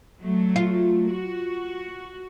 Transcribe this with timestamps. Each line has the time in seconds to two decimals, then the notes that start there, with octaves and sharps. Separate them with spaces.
0.21 F#3 A3
0.56 F4
1.11 F#4